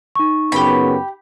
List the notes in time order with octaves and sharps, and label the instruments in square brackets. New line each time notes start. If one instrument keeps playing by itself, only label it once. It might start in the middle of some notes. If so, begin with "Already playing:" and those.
[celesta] D#4 C#6
[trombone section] F#2 C#3 B3 [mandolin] G4 B5